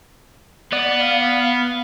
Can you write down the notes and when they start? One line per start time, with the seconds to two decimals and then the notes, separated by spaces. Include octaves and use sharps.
0.73 B3 D5
1.00 F5